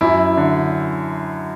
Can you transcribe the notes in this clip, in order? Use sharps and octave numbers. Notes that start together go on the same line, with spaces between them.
F#2 E4
D3